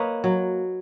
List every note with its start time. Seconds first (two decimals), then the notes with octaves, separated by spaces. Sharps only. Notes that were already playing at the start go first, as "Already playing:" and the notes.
Already playing: A#3 B4 C#5 D#5
0.24 F#3